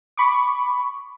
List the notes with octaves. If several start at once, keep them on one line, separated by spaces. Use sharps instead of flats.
B5 C#6 D6